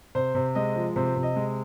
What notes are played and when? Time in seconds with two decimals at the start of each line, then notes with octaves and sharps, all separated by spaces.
0.15 C3 C5
0.35 C3
0.55 G#3 D#5
0.75 F3
0.96 C3 C5
1.16 C3
1.23 D#5
1.36 G#3